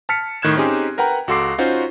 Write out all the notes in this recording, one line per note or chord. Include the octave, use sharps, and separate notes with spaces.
A5 F6 B6 C#7
A2 D#3 F#6 G#6 E7
C4 C#4 D#4 G4 G#4 C6
A#4 B4 F#5 G5 A#5
C#2 F#4 A4 C6 D6 C7
C#4 D#4 F4 F#4 C5